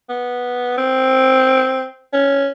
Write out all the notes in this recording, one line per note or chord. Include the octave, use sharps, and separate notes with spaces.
B3
C4
C#4